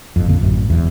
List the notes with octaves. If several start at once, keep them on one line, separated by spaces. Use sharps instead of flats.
F#1 F2
A#1 F2 D3 A#3
A1 F#2
E1 E2